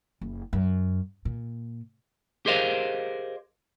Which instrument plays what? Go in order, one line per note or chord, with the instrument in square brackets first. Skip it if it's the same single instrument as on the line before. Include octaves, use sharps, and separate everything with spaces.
[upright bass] F#1
F#2
A#2
[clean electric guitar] G4 G#4 A#4 C5 D#5 F5